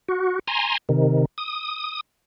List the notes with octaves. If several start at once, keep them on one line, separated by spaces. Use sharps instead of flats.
F#4
G#5 A#5 C6
C3 D#3
D#6